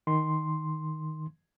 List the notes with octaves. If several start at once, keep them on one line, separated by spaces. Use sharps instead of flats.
D#3 C6